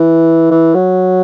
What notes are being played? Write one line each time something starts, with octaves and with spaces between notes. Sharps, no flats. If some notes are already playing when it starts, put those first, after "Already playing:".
Already playing: E3
E3
F#3